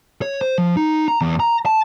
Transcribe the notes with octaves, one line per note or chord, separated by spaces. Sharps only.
C#5
C5
F3
D#4
A#5
E2
A#5
A5